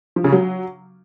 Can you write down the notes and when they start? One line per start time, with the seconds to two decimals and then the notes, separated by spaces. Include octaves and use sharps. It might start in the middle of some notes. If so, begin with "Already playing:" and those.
0.16 F3
0.24 C#3
0.32 F#3